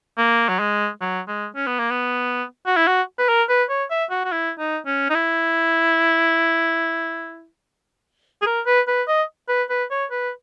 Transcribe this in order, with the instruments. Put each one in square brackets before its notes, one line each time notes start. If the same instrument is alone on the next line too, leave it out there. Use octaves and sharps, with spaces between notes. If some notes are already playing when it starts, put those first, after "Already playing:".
[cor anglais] A#3
F#3
G#3
F#3
G#3
C#4
B3
A#3
B3
F#4
E4
F#4
B4
A#4
B4
C#5
E5
F#4
F#4
E4
D#4
C#4
D#4
E4
G#4
A#4
B4
B4
D#5
B4
B4
C#5
B4